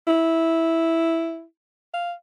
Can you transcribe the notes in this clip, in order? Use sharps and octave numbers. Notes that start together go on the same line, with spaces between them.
E4
F5